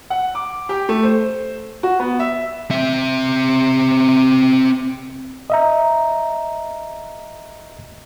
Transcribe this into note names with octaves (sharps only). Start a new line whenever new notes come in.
F#5
D6
G4
A3
C5
F#4
B3
E5
C4 E5
D#5 E5 A#5